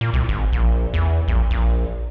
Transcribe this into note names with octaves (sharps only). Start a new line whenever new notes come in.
A#2
C2
G#1
A#1
E2
A#1
A#1